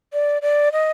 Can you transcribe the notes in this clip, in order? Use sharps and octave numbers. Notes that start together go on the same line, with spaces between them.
D5
D5
D#5